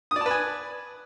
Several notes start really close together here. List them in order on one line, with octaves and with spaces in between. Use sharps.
D#6 D5 A5 B4 G#5